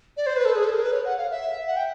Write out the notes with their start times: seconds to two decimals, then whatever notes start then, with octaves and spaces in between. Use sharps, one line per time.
0.17 D5
0.26 C5
0.36 B4
0.45 A4
0.55 G#4
0.64 A4
0.74 A#4
0.83 B4
0.92 C#5
1.05 F#5
1.18 F5
1.31 E5
1.68 F#5
1.76 G5